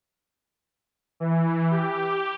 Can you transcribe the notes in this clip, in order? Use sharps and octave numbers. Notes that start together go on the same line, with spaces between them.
E3
G4